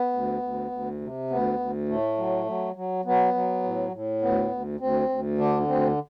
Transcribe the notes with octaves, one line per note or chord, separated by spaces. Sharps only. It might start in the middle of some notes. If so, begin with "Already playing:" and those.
Already playing: B3
D2
D2
D2
C3
D2 B3
D2
A2 A3
F#3
F#3
F#3
F#3 B3
F#3
A2
A2
D2 B3
D2
D2 C4
D2
D3 D4
D2 C4